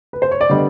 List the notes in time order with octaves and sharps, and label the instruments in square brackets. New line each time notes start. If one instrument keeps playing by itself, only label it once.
[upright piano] B4
C5
C#5
D5
D3 G3 B3 D#5